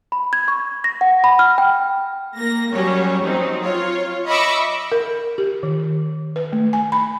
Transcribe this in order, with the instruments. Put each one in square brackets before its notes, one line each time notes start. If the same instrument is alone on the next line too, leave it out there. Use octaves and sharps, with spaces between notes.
[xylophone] B5
G#6
C#6
A#6
F#5
B5
F6
G5
[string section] A#3 A#6
F#3 G3 C#4 C#5
F#3 C4 D#4
F4 C#5
D#5 E5 B5 C#6 D6 E6
[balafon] A#4
G4
D#3
B4
A3
G#5
B5